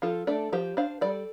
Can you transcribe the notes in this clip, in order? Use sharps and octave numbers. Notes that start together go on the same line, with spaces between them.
F3 F4 A4
A3 D4 A4 D5
F3 G4 C5
D4 C5 F5
G3 A4 D5